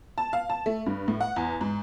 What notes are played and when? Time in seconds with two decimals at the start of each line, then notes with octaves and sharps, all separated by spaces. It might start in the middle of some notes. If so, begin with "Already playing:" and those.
0.18 A5
0.33 F5
0.50 A5
0.66 A3
0.86 G2
1.08 A2
1.21 F#5
1.36 E2
1.61 G#2